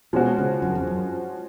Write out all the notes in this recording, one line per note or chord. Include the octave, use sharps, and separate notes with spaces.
B2 F3 G#3 C#4 F#4
C#3
F#2
F2
F#2